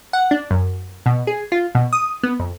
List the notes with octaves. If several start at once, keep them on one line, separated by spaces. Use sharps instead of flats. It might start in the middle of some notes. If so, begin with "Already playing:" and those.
F#5
D4
F#2
B2
G#4
F4
B2
D#6
B3
F2